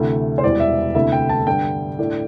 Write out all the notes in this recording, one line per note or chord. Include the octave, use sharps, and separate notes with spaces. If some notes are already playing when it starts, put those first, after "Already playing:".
Already playing: D2 C3 E3 A3
C5
E1 E2 E3 G3 D5
E5
D2 C3 A3 E4 E5
G5
A5
G2 D3 G3 G5
A2 A3 D4